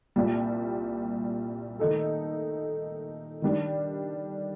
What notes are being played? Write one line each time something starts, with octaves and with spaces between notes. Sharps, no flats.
C2 A#2 G3
D#3 A3 D#4 A4
D#3 G3 D4